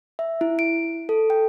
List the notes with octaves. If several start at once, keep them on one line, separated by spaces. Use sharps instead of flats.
E5
E4
D7
A4
G5